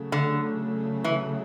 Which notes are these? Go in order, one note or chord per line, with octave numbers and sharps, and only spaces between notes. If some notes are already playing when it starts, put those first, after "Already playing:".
Already playing: C#3 F#3 A3
D3
E3